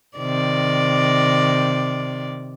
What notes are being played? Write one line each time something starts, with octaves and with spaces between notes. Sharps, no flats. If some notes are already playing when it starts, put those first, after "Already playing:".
C3 D#3 D5